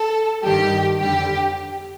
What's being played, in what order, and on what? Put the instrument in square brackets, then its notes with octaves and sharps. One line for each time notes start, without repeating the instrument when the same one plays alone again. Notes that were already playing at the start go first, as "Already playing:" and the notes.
Already playing: [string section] A4
G2 D#3 G3 G4
F2 D3 G3 G4